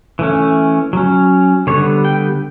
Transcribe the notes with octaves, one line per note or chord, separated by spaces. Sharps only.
E3 A3 C#4
F#3 C#4
D3 G3 B3 C#5
G5